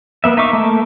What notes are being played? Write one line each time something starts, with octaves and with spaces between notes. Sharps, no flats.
A#3 B3 E5
D#4 E5 F5 C#6 D6
A3 A#3